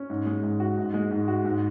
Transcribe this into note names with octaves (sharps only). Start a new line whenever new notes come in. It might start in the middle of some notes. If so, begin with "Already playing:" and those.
Already playing: C#4
G#2
G#3
G#2
F#4
G#2
G#3
G#2
F#4
G#2